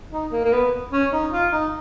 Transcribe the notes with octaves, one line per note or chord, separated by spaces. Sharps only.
D#4
A#3
A#3
B3
C#4
D#4
F4
D#4